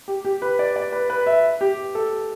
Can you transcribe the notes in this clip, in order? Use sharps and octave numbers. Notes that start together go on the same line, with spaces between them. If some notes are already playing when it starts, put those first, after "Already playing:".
G4
G4
B4
D5
D5
B4
B4
E5
G4
A4